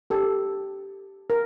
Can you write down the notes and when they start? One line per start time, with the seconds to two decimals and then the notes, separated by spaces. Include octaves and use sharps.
0.10 G4 A4
1.30 A#4